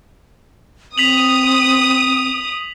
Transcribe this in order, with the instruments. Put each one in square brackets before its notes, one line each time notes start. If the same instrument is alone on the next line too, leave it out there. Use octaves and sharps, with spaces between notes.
[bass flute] C4 [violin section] D#6 [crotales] B6 F7 F#7